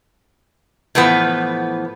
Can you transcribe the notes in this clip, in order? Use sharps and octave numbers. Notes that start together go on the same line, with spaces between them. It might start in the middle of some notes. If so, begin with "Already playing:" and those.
A2 E3 F3 B3